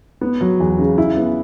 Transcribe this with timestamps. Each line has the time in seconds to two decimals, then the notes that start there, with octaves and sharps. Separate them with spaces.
0.21 B3
0.41 F#3
0.60 E2
0.79 C#3
0.98 E4
1.17 B3